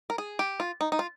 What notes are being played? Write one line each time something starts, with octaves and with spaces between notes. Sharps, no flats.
A#4
G#4
G4
F4
D#4
D#4
F4